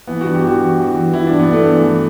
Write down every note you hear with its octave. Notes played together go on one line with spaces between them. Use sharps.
E3 B3
G2 F#4
G4
E3 F#4
E3
E3
E3
E3 E4
D4
G2
B3
G2 A3
E3
E3